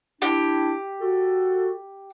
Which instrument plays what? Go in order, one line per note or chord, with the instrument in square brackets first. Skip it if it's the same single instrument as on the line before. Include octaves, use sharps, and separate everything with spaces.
[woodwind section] D4 E4 [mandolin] G4
[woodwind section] F#4 A4